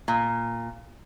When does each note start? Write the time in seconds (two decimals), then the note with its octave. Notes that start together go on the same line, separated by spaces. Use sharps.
0.08 A#2